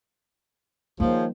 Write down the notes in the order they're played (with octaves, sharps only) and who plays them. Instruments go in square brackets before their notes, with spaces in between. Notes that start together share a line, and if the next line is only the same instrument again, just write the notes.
[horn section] D#3 F3 [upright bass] G3 A#3 [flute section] G#4 C5 C#5